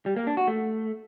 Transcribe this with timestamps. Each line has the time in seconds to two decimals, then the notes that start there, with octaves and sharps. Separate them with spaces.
0.06 G3
0.16 A#3
0.27 D4
0.37 F#4
0.48 A3